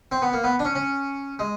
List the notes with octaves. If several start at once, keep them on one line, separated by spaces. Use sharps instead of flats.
C4
B3
A#3
B3
D4
C#4
C#4
G#3